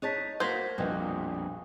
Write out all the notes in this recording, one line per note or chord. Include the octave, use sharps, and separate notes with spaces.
D#4 C#5 A5 F#6 A6 B6
A#3 F#4 C5 G#6 B6
A#1 F2 B2 G3 B4 D#6 F#6